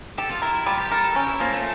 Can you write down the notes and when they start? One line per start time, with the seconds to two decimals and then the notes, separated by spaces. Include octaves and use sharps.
0.18 G4 A4
0.30 F4
0.42 E4 A#4
0.55 E4
0.66 G3 F4
0.79 G4
0.91 A4 A#4
1.04 A4
1.16 C#4 G4
1.28 E4
1.40 F3 A#3
1.52 A3